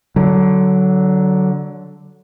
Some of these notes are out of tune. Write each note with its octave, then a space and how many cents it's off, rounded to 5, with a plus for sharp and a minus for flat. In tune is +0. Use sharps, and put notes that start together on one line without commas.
D3 +0 F#3 +20